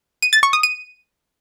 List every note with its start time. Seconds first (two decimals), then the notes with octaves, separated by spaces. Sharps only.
0.22 D#7
0.33 A6
0.43 C#6
0.53 D#6
0.63 D#7